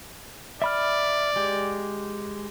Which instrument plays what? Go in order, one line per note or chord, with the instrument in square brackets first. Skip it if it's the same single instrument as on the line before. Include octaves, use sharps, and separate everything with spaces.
[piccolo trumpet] D5 [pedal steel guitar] E5 B5 F6
[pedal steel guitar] G#3 G4